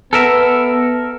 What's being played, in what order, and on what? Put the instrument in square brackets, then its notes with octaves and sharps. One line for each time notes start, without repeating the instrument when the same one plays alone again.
[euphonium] B3 [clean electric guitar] A4 A#4 E5